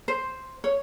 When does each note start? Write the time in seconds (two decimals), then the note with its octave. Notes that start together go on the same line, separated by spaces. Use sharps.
0.08 C5
0.64 C#5